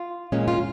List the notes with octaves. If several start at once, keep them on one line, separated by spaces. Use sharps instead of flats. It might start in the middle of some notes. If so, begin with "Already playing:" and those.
Already playing: F4
A#2 G#3 C#4
F4